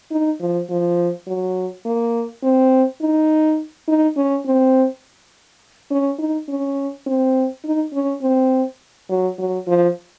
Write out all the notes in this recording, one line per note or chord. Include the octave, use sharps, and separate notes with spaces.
D#4
F3
F3
F#3
A#3
C4
D#4
D#4
C#4
C4
C#4
D#4
C#4
C4
D#4
C#4
C4
F#3
F#3
F3